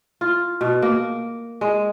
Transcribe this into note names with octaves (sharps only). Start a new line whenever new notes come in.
F4
B2
A#3
G#3